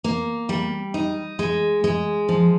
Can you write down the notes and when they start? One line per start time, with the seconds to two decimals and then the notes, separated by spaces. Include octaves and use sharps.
0.04 A#3
0.49 G3
0.94 D#4
1.39 G#3
1.84 G#3
2.29 F3